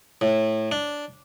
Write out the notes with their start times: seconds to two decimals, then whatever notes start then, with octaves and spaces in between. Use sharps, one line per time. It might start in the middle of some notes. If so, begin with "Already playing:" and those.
0.21 A2
0.71 D4